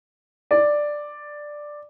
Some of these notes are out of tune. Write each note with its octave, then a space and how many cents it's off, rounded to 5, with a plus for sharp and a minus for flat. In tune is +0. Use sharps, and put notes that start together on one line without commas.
D5 +5